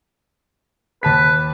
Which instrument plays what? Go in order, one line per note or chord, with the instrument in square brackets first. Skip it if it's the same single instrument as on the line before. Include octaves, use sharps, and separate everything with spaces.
[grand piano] D#2 A5 B6 [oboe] B4